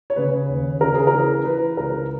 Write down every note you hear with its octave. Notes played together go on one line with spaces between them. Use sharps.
C#5
C#3 B4
D#2
C#3 A#4
G#4
A#4
E3
E3 B4
C#2 A#4